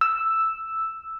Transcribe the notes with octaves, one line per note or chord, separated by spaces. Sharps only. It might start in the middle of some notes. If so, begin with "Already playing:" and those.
E6